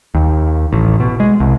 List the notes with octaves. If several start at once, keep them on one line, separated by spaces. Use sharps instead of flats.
D#2
A1
B2
G#3
C2